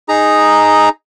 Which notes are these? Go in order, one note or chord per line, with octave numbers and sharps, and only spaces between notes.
D#4 G#4 A#5